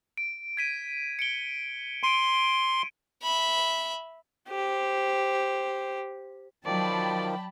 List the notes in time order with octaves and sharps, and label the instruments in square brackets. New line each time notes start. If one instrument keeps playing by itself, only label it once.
[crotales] D7
G#6 B6 D#7
C#7 D7 G7
[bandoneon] C6 [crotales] D7 D#7
[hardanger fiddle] E5 B5
[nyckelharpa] G4 C5
[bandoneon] D#3 F3 [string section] F#3 [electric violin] D5 [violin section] G5 A5 B5